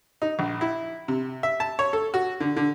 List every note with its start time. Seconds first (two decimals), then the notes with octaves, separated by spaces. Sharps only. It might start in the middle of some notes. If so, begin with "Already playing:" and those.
0.22 D#4
0.39 A#1
0.61 E4
1.08 C3
1.43 E5
1.60 A5
1.79 C#5
1.93 A4
2.14 F#4
2.40 D3
2.57 D3